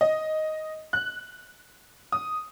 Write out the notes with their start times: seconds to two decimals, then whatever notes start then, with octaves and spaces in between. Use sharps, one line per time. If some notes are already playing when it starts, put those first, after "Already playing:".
0.01 D#5
0.93 F#6
2.12 D#6